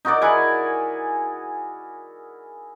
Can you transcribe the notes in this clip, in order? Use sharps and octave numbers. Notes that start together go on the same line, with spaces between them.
D#4 F#4 A#4 D5
E4 G#4 F#5 G#5